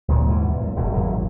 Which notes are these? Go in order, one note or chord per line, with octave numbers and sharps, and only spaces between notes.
D2 A#2 D#3 F3
D#2 G#2 B2 E3
E2 A#2
F#2
D#1 G#1 B2 F#3
D#1 G#1 F#3